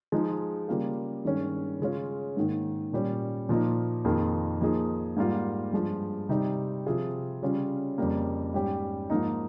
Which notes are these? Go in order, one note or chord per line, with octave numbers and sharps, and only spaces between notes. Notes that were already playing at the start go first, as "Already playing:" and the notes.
F3 G#3 D#4 G#4
C#3 G3 A#3 F4 G#4
G2 D#3 G#3 C#4
C#3 G#3 C#4 F4
G#2 D#3 A#3
A#2 G3 C#4
A#2 F3 A#3 D#4
F2 D#3 A#3 F4 G#4
F3 A#3 D#4 G#4
G#2 G3 A#3 F4
G2 F3 G#3
C3 G3 C4 D#4
C3 F3 C4 F4 G#4
C#3 G3 C#4 F4
F2 C#3 G3 A#3
G#2 G3 C#4 G4
G#2 F3 A#3 D#4